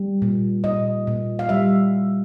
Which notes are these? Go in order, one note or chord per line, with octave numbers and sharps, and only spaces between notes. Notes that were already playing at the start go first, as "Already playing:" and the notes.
Already playing: G3
A#2
A#2 D#5
A#2
F5
G3 E5